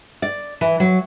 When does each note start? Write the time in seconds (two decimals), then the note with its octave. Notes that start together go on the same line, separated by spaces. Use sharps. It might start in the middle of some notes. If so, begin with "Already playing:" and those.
0.22 D5
0.61 E3
0.80 F#3